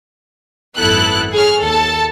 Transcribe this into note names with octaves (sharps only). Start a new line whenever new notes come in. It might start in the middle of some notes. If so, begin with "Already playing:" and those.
G#1 F#2 B3 E4 A4 F#6
G#4 C#5 F6
D#2 A4 A5